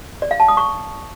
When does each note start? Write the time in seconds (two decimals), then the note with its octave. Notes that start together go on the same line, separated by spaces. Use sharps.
0.22 D5
0.31 F5
0.40 A5
0.48 D#6
0.57 C#6